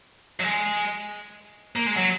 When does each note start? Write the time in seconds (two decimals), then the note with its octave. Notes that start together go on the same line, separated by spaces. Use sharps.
0.40 F#3
0.43 G#3
1.76 A#3
1.86 G#3
1.97 F#3